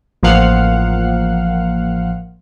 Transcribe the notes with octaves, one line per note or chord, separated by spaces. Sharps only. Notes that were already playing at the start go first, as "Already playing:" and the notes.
A1 F3 A#3 F5 F#5